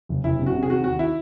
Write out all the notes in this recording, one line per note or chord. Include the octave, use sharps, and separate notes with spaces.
F#1
F#1 E4
C3
F#4
C3
G#4
D#3 F#4
D#2 F#4
E4